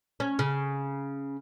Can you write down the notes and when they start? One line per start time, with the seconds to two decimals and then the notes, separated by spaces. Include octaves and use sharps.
0.20 C#4
0.39 C#3